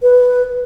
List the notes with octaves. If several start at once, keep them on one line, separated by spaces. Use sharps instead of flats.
B4